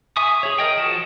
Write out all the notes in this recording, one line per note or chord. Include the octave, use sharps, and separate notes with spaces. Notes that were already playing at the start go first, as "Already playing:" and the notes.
E5 G#5 C#6 D#6
G#4 C#5
A#4 D#5 G5
F3 F#4 A5